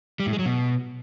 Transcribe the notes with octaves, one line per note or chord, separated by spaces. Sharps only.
G3
A2
G#3
F#3
B2